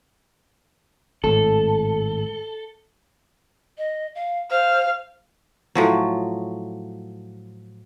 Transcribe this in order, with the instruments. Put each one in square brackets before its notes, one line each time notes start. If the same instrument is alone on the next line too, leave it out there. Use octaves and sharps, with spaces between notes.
[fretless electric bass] G#1 A2 [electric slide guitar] A4
[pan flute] D#5
F5
[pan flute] C5 [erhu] F5
[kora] A2 F3 F#3